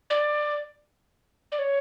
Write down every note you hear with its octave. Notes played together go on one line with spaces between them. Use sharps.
D5
D5
C#5